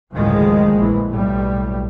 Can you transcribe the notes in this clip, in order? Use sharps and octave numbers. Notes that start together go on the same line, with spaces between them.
F#1 D2 A2 D#3 F3 G#3
A#1 E3
B1 A2 G3